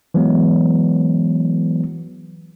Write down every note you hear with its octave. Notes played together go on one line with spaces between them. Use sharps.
E3 F#3 G#3 B3